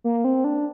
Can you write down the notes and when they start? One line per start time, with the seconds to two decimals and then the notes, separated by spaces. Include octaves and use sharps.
0.04 A#3
0.24 C4
0.44 D4